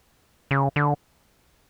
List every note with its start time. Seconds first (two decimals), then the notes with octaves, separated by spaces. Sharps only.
0.51 C#3
0.76 D3